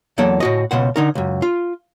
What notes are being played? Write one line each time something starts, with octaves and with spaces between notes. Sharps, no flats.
E2 F#3 A#3 A4 F#5
A2 F#4 D#5
C#2 B2 C5 F#5
D3 D#4 A#4
C#2 F#2
F4